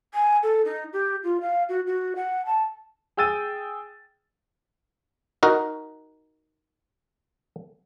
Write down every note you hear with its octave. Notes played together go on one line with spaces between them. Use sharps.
G#5
A4
D#4
G4
F4
F5
F#4
F#4
F#5
A5
G#4 G5 E6 A6 D#7
D#4 F#4 A#4